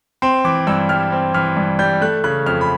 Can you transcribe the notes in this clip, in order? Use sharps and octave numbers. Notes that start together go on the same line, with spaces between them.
C4 C6
E3 D6
G2 E6
G3 F6
C4
E3 F6
G2
G3 G6
A3 F#6
C#3 F#6
F2 F6
B5